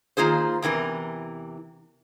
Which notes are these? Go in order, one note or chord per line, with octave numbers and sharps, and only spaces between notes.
D#3 A#3 F4 G#4 C5
E2 C3 E3 A#4